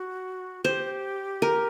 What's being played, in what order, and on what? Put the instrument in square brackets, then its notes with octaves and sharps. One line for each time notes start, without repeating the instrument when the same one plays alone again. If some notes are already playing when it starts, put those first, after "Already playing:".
Already playing: [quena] F#4
[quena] G4 [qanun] C5
[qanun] A#4